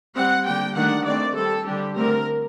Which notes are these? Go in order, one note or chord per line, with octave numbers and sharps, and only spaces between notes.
G3 C4 F#5
D3 G3 A#3 G5
D#3 A3 D4 F#5
D#3 A3 C4 D5
G3 C4 A4
D3 G3 D4 G4
D3 A3 C4 A#4